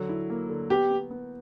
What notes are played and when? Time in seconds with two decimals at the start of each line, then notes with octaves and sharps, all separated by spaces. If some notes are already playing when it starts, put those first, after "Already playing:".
Already playing: D3 F#3
0.09 E4
0.30 A#3
0.49 D3
0.70 B3 G4
0.91 B3
1.11 B3